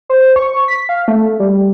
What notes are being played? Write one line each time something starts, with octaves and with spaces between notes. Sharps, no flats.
C5
C#6
B6
F5
A3
G3